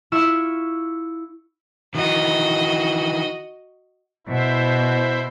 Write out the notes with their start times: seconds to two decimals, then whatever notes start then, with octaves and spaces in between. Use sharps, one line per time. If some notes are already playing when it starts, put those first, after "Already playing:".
0.12 E4 F4 C#6 E6
1.95 D#3 E3 F#4 D#5
4.27 B2 E4 C5 E5